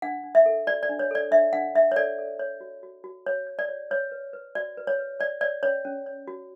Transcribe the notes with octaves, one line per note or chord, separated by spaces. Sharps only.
D4 F#5
D4
E5
A4
F#4 D5
D5
D4
C#5
A4 D5
D4 E5
D4 F#5
D4 E5
C#5
A4 D5
A4
C#5
F#4
F#4
F#4
C#5
C#5
D5
C#5
B4 C#5
B4
B4
F#4 D5
B4
C#5
B4
C#5 D5
C#5 D5
C#4 C#5
C#4
C#5
F#4